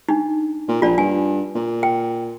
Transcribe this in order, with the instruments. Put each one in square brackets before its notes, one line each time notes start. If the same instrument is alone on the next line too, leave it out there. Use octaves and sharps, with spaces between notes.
[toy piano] D4 D#4
[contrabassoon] A#2
[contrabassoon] A#1 [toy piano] F4 D5
[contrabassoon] G2 [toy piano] G#5
[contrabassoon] A#2
[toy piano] G5